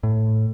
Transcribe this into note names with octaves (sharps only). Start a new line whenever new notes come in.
A2